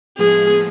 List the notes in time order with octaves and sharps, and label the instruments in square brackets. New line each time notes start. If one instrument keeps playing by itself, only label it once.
[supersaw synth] A2 F3 G#3 B3 [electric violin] G#4